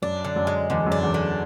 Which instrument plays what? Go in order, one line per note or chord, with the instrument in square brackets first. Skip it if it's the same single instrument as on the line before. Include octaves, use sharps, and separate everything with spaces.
[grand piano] F#2 [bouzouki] D4
[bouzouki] D3
[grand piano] F#2
[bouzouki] G#3
[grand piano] E2 [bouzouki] D3
[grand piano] F#2
[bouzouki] D4
[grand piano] E2
[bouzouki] D3